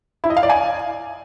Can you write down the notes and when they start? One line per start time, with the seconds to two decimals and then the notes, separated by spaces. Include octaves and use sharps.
0.24 E4
0.30 D#5
0.37 F5
0.43 D5
0.49 G#5